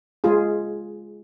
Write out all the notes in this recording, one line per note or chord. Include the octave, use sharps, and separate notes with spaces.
G#3 F4 G#4